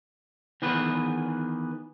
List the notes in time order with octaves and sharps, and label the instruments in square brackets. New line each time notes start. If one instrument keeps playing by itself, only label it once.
[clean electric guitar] D#3 E3 B3 G#4 B4